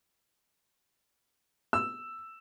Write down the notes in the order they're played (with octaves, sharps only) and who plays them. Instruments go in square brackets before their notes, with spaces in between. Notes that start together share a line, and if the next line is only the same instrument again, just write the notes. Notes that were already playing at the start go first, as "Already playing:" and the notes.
[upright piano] E6